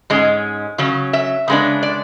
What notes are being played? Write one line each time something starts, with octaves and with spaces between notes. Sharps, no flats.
G#2 G#3 C#4
C#3 F#3 C#4
E5
C#3 G#3 B3 D4
D5